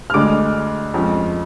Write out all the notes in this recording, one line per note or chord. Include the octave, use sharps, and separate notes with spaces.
F6
D2 D3 G#3 D6
F2 F3 G#3 C#4